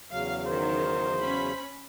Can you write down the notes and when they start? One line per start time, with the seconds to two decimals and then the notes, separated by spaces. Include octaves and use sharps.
0.11 E2 C#3 F#3 F5
0.47 D#3 C5
1.19 C#4 B5